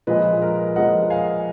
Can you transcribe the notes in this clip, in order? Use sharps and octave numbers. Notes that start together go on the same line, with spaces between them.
A#2 F3 G#3 B4 D#5
A#4
A#2 F3 G#3 D#5 F#5
F5 G#5